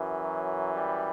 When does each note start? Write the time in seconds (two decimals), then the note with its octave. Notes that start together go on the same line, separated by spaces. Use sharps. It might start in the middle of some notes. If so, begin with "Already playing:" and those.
Already playing: F#2 E3
0.20 F#3
0.73 G3